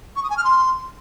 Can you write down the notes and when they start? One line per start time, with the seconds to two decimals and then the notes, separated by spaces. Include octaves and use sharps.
0.16 C#6
0.23 D#6
0.30 G#5
0.37 F6
0.44 C6